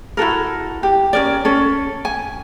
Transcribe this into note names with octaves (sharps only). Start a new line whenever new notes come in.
E4 F#4 A4 A#4
G4
C#4 A#4 D5
C#4 A4
G#5